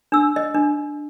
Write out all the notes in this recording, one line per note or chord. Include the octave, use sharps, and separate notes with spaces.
D4 E6
D#5
D4